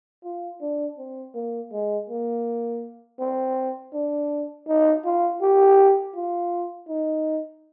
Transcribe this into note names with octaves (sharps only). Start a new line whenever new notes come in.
F4
D4
C4
A#3
G#3
A#3
C4
D4
D#4
F4
G4
F4
D#4